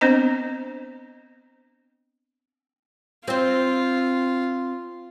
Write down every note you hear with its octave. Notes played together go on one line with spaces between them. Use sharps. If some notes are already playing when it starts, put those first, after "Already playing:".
B3 C4 D4 C5 D#5 A#5
C4 F4 C5